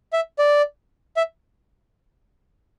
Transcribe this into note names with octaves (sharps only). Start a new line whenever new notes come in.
E5
D5
E5